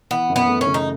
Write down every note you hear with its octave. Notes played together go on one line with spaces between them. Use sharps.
E3 B3
F#2
B3
A3
C#4
C#3
D#4